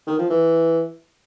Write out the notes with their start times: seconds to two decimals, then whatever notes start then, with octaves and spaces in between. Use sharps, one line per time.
0.07 D#3
0.19 F3
0.30 E3